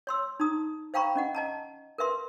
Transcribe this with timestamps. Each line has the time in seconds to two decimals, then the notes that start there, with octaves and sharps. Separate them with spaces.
0.07 C#5 C6 E6
0.40 D#4 A#5 D#6
0.94 C5 F5 G5 A#5 B5 C#6
1.16 C#4 D#5 F#5
1.35 D#5 A5 A#5
1.98 A#4 B4 E5 C6